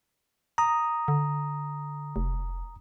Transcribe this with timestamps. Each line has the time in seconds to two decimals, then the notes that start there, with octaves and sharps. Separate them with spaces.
0.58 A#5 D#6
1.08 D3
2.16 F1